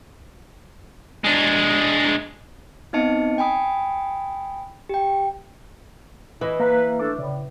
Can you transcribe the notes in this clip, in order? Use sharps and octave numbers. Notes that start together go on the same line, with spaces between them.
G#3 D4
B3 C4 D#4 D#5 A5 C#7
G5 G#5 B5 D#6
G4 G5
E3 E4 D#5
A#3 B4 F5 A#5
A3 D4 A4 D6
A2 C#3 D5